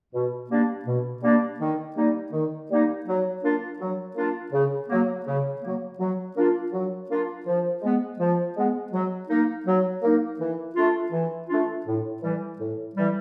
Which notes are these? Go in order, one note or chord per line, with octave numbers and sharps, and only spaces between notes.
B2
G3 A#3 D4
B2
G3 A#3 D4
D#3
G3 A#3 D#4
D#3
G3 A#3 D#4
F#3
A#3 D4 F4
F#3
A#3 D4 F4
C#3
F#3 A#3
C#3
F#3 A#3
F#3
A#3 D4 F4
F#3
A#3 D4 F4
F3
G#3 B3
F3
G#3 B3
F#3
A#3 D#4
F#3
A#3 D#4
E3
A3 D4 F4
E3
A3 D4 F4
A2
E3 G3
A2
E3 G3